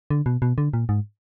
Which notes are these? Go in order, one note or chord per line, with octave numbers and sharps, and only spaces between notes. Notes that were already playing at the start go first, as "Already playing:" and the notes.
D3
B2
B2
D3
A#2
G#2